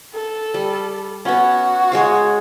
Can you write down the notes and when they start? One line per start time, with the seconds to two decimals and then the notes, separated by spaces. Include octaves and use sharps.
0.13 A4
0.54 G3
1.25 B3 C#4 F#4
1.92 G#3 C#5 F5